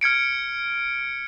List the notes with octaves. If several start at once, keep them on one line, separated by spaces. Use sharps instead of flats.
F6 G#6 C#7 D7